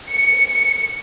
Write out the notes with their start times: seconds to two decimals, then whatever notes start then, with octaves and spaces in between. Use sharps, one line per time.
0.10 C#7